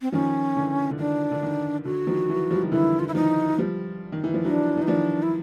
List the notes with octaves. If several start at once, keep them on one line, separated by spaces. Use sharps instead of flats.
C4
D#3 F3 C#4
D3 E3
D3
D#3 D4
D3
D#3
D3 F#4
D#3 F3
E3 F#3
F3 G3
D#3
D3 E3 E4
F4
E4
D#3 F3 D#4
F3 G3
D#3
E3
F3
E3 F#3 D4
E3
D#4
D#3 F3 D4
E4